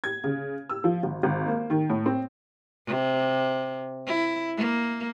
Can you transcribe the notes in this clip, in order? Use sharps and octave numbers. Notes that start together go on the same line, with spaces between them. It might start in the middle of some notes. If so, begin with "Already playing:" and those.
G#6
C#3
E6
F3
G#1
G#1
A#3
D#3
A2
C4
C3
E4
A#3